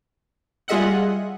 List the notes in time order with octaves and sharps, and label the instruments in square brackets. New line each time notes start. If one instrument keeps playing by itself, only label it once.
[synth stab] G3 F4 G#4 D#5 E5 F#5